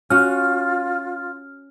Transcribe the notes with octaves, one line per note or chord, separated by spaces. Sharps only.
C#4 F4 F#4 F6